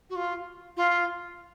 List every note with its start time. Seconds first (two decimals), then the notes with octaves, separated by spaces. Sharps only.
0.09 F#4
0.15 F4
0.76 F4